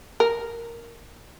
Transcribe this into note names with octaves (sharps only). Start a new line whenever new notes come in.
A#4